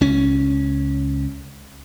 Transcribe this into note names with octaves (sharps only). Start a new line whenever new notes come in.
C#2 C#4